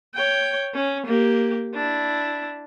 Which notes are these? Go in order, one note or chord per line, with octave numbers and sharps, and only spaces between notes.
C#5 G5
C#4
A#3 G4
D4 E4